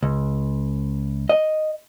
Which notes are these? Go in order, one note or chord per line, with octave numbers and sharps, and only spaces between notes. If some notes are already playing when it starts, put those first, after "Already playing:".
C#2
D#5